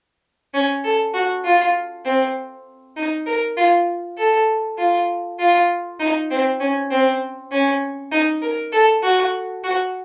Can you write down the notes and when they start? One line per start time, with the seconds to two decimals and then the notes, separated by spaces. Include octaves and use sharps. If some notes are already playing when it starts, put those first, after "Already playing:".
0.54 C#4
0.84 A4
1.14 F#4
1.44 F4
2.05 C4
2.96 D#4
3.26 A#4
3.57 F4
4.17 A4
4.78 F4
5.39 F4
5.99 D#4
6.30 C4
6.60 C#4
6.91 C4
7.51 C#4
8.12 D#4
8.42 A#4
8.72 A4
9.03 F#4
9.64 F#4